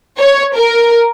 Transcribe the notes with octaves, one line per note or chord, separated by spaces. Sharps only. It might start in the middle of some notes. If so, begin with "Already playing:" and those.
C#5
A#4